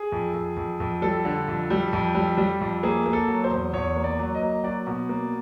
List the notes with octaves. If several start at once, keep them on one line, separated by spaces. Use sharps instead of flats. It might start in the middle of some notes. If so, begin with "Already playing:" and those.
Already playing: G#4
F2
F2
F2
F2
G3 A4
D3
F2
G3
F2
G3
G3
F2
A#3 G#4
A#3
A4
F#3
C5
E2
E2 C#5
A#3
D5
F#3
D#5
A#3
F#3 D5
B2
A#3